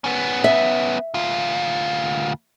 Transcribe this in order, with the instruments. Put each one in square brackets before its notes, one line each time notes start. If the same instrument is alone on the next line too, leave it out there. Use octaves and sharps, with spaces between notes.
[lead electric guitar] B3 C#4
[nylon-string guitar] E5
[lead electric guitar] D2 F4